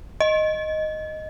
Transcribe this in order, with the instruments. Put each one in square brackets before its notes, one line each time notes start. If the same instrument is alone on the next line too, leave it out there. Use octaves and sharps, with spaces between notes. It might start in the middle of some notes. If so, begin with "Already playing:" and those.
[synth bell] D#5